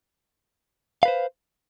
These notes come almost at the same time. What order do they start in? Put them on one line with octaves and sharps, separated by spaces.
F5 B4 C5